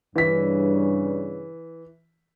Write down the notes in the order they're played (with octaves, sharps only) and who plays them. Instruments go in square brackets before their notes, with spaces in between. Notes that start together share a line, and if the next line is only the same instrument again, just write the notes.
[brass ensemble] G2 C#3 [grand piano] E3 B6